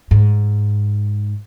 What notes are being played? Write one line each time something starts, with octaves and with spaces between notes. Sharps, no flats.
G#2